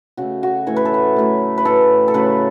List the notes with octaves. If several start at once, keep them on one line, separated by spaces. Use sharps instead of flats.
C#3 A3 F#4
F#4
A2 E3 A3 C#5
B4
A4
B4
A2 F#3 A3
B4
A2 E3 A3 A4
A4
C#3 F#3 A3 B4